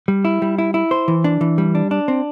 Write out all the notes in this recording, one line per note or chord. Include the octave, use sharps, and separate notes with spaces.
G3
E4
G3
E4
E4
C5
E3
D4
E3
G3
D4
D4
C4